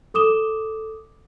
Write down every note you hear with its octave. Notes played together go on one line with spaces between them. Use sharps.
A4 D6 D#6 E7 G7